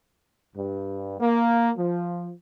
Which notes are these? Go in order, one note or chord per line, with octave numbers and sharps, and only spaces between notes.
G2
A#3
F3